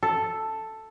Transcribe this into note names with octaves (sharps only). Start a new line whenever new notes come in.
A4